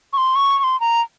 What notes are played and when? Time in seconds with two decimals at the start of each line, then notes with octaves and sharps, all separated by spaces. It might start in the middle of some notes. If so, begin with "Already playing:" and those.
0.13 C#6
0.18 C6
0.36 C#6
0.59 C#6
0.64 C6
0.80 A#5